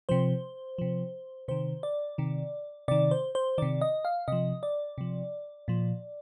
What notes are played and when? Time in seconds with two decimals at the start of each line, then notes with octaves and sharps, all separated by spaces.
0.09 C3 F3 C5
0.78 C3 F3
1.48 C3 D#3 C5
1.83 D5
2.18 C3 D#3
2.88 C3 D#3 D5
3.11 C5
3.35 C5
3.58 C3 D#3 D5
3.81 D#5
4.05 F5
4.28 C3 F3 D#5
4.63 D5
4.98 C3 F3
5.68 A#2 F3